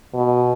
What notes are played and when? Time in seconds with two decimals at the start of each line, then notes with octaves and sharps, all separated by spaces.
0.14 B2